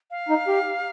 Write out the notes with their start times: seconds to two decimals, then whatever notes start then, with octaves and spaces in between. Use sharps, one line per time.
0.11 F5
0.29 D#4
0.48 G4